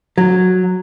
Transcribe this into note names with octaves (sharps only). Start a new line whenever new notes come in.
F#3